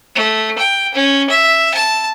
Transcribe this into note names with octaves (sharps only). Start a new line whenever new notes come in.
A3
G5
C#4
E5
A5